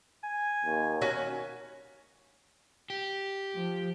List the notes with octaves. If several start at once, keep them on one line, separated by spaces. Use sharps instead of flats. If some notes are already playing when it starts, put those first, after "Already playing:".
G#5
D#2
C#4 F#4 G#5
G4
F3